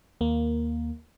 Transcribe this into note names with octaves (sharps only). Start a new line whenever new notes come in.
D#2 A#3